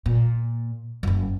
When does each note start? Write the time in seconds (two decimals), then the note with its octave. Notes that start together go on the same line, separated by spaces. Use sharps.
0.06 A#2
1.03 F#1 F#2